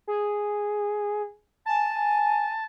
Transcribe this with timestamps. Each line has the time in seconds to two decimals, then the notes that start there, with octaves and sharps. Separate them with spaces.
0.07 G#4
1.66 G#5 A5